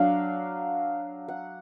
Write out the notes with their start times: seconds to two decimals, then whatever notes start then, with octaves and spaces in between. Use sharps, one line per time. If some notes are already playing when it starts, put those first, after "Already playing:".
Already playing: F#3 D4 F5
1.28 F#5